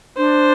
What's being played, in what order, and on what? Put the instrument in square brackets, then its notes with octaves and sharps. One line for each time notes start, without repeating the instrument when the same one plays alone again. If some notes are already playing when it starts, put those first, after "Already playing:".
[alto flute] D4 [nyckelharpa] C5